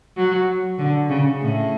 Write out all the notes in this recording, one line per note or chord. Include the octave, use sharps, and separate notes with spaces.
F#3
D3
C#3
A2